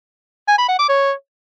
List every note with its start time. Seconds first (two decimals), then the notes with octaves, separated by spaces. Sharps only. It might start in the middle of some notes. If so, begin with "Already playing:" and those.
0.48 G#5
0.58 B5
0.68 F#5
0.79 D6
0.89 C#5